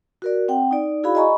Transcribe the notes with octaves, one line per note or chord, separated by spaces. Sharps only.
F#4 A#4 D5
C4 F#5 G5
D#4 D5
E4 F#4 G#4 D5 F5 B5
D#5 G#5 A#5 B5 C#6